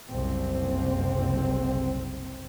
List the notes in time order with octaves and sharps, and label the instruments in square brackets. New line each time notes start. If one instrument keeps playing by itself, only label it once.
[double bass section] F#1 C2 C4